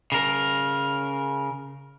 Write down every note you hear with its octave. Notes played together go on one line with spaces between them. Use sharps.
C#3 A#4